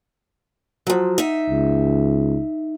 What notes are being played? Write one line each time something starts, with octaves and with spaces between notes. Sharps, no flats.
F3 F#3
D#4 E5
C#2